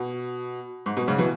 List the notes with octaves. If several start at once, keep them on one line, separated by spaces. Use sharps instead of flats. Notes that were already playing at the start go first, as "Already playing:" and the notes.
Already playing: B2
G#2
B2
G#2 C#3
B2 E3